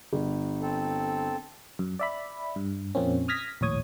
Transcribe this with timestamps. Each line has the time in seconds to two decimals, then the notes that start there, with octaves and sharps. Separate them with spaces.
0.13 G1
0.61 C4 A4
1.79 F#2
2.00 D5 E5 B5
2.56 G2
2.95 F2 A#2 A#3 C4 C#4
3.28 D#6 F6 G#6 A#6 B6
3.61 A#1 D#2 A2 C#5 D#6 G#6